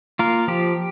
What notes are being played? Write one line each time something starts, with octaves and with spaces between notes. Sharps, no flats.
A#3 F4 A#4
F3 G4